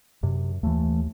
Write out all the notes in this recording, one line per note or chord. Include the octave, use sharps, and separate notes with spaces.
F#2 C3
D#2 E3 A3